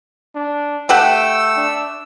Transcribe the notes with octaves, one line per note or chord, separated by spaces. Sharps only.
D4
A3 G4 F#5 G5 E6
D4